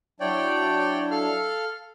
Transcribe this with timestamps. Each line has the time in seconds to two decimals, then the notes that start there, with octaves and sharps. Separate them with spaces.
0.20 F#3 D4 E4 C#5 D5 G5
1.11 A4 F5 F6